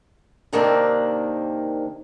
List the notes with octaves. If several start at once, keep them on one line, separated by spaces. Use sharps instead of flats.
C3 D#3 A#3 C4 D4